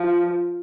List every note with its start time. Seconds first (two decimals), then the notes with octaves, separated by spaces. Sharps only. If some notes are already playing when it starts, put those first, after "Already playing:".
Already playing: F3